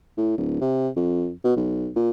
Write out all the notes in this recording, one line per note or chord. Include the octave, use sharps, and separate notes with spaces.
A2
D1
C3
F2
B2
B1
A#2